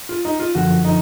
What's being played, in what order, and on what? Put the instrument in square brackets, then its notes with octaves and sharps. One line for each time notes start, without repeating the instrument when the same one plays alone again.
[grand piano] F4
D#4
F4
[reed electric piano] F#2 D3 F3 [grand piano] F#4
[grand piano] D#4